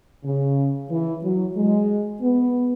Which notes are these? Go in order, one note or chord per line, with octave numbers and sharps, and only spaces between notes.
C#3
E3
F#3
G#3
B3